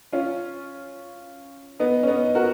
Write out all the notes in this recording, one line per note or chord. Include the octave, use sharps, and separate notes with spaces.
C#4 F4
B3 D#4
C#4
B3 D#4
F#4 A#4